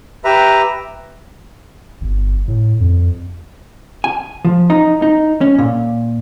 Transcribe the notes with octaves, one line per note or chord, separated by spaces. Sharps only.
G4 B4 E5 A#5
G1
A2
F2
G#5
F3
D#4
D#4
C#4
A#2